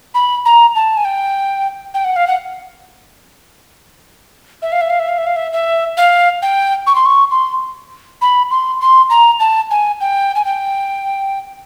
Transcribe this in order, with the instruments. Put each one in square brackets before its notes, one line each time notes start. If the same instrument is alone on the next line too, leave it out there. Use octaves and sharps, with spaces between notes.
[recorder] B5
A#5
A5
G#5
G5
G5
F#5
F5
F#5
E5
F5
E5
F5
E5
F5
E5
F5
E5
E5
F5
G5
C#6
C6
C#6
C6
B5
C6
C6
A#5
A5
G#5
G5
G#5
G5